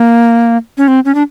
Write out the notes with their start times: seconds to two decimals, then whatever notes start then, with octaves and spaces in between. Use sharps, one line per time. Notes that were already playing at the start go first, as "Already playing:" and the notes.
Already playing: A#3
0.78 C#4
0.88 C4
1.05 C#4
1.15 D4